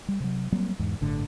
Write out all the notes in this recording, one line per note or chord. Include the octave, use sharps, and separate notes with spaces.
G3
C3 F#3
F#3 G3 A#3 C4
E2 G#2
G1 A2 D3